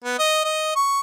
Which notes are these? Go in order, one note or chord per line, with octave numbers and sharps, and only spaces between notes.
B3
D#5
D#5
C#6